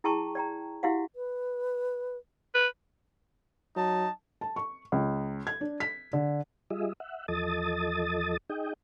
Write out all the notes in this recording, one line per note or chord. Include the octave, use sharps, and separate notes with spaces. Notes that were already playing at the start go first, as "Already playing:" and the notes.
E4 G#4 G5 A5 A#5 C#6
D5 G5 A#5
E4 F#4 G4 F5 F#5
B4
B4
F#3 D#4 A5
A5
C#6
C#2
G#6
D4
B6
D3
G3 F4 G#4 D#5 E5
E5 F#5
E2 F3 A4 D#5 D#6 A6
D#4 G#4 D#5 G5